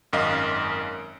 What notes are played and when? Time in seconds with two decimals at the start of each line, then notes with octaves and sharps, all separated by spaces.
0.13 G#1 F#2 A#4 D#5 F5